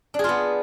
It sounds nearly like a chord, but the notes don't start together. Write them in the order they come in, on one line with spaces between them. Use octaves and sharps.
D4 G#4 F4 B3